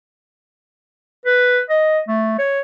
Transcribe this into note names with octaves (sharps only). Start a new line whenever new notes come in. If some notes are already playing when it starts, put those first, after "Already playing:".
B4
D#5
A3
C#5